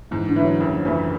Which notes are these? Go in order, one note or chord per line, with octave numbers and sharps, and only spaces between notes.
G#2 E3
D3
E3 A3
F#3
F#1 F#3
F3
F#2 C#3 E3 F#3 A3